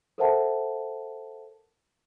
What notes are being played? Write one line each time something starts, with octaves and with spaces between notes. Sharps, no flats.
A4 A#4 C5 E5 F#5 A5